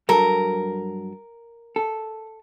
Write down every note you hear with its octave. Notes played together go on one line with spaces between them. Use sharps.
G2 F#3 A4 A#4
A4